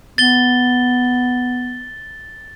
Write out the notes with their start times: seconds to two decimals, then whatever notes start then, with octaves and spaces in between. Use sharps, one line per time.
0.18 B3 A6 G7